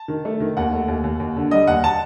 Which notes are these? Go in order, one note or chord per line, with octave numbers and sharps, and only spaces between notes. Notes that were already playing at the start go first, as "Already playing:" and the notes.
Already playing: A5
D#3
A3
D#3
D#2 F#5
A3
D#2
D#2
D#2
D3
G3 D#5
D#2 F#5
A5